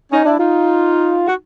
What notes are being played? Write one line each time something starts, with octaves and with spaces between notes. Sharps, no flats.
C#4 D#4
D4 E4
D#4 F4
F#4